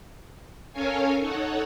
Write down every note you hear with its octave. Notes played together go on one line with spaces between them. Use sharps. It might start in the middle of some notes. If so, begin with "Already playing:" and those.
C#4 A4 A#4 C#5 F5 G#5
D#4 A4 C#5 F#5